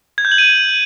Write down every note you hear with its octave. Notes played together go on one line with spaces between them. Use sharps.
G#6
G6
F#7
D#7